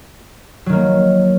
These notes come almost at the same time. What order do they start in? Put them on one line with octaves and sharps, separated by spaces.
F#3 D#3 A#3